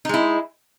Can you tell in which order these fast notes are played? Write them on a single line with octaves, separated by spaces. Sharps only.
D#4 G#3 E4